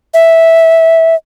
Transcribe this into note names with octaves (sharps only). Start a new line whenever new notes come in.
E5